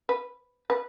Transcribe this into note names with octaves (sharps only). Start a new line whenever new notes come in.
B4
B4